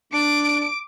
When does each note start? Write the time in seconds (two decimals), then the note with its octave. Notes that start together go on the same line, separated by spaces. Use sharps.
0.13 D4 D6 D7